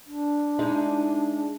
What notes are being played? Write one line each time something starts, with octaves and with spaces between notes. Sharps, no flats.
D4
G#3 D#4 E4